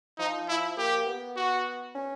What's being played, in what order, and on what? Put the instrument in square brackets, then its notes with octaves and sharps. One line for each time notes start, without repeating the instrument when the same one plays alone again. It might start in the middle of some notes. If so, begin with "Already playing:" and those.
[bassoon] F3 [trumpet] D#4
[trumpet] E4
[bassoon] A#3 [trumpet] G4
[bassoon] B3
[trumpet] F#4
[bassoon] C#4